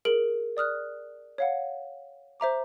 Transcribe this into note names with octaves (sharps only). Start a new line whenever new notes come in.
G#4 A#4 D7 F#7
D5 D#6 F6 F#6
C#5 F5 F#5
C5 E5 A#5 D6